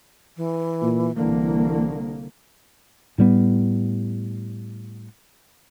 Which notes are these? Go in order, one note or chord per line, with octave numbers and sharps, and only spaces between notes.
E3
A#2
C2 D3 E3 A#3
A2 G3 B3